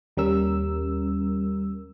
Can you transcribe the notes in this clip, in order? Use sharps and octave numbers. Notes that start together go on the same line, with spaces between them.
D#2 G3 C#4 A#4 E6